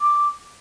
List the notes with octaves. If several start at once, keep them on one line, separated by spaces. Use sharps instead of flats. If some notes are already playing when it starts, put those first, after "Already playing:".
D6